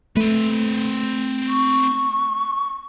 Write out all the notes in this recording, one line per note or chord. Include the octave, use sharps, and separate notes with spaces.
A3 C4 B4
C#6